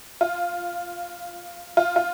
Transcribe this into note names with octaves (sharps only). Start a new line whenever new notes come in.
F4
F4
F4